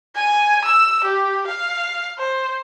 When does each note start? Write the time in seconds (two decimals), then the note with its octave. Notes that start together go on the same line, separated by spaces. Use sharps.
0.15 G#5
0.64 E6
1.04 G4
1.46 F5
2.18 C5